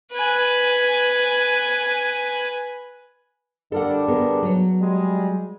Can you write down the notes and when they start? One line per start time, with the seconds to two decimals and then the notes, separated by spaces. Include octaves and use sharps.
0.13 B4 G#5
3.72 D3 G3 D4 A4 A#4 F#5
4.08 B3 G#4 A#4
4.42 F#3 C#5
4.81 G3 G#3